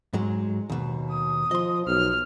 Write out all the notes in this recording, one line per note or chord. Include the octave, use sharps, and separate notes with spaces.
G#2 F#3 G#3
D#2 B2
D#6
F3 D#5 C6
B1 F6